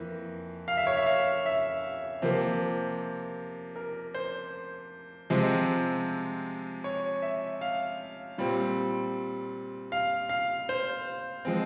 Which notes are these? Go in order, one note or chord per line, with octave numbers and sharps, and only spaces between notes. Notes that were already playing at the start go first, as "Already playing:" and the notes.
Already playing: F2 E3 A#3
F5
E5
C#5
E5
F5
E5
C3 F3 A#3
A#4
C5
C3 F3 G#3 C4
C#5
E5
F5
A#2 G3 C4
F5
F5
C5
F3 G#3 C4